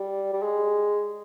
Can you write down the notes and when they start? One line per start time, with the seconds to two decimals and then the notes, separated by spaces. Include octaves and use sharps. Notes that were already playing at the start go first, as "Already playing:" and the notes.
Already playing: G3
0.34 G3
0.43 G#3